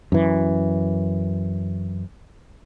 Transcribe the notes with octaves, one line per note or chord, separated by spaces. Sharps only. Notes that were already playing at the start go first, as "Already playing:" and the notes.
F#2 E3